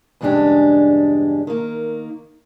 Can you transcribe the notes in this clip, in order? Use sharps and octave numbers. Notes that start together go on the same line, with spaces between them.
E2 G2 C#3 G#3 D4 G4
D#3 A#3